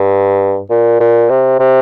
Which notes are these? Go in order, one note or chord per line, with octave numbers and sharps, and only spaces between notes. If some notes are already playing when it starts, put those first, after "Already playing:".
Already playing: G2
A#2
A#2
C3
C3